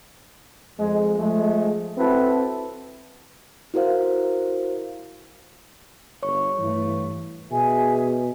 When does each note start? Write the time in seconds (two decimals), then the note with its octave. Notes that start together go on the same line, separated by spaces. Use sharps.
0.79 F2 G#3
1.18 F3 G#3 A3
1.98 C4 E4 F#4 A4 B4
3.74 E4 F#4 A#4 C5 F5
6.23 G1 C#5 C#6
6.58 G2 E3 A3
7.51 B2 G#4 E5 G#5